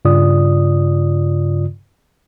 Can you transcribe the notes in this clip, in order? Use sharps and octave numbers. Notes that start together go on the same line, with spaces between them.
G2 C#3 F4 D5 D#6